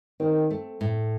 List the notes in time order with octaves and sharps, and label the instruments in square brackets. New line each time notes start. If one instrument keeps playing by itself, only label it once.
[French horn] D#3 [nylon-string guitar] C4
[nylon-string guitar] A3
A2